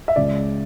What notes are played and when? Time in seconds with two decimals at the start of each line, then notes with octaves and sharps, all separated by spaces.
0.08 E5
0.16 C#2 C#3 G#3 D5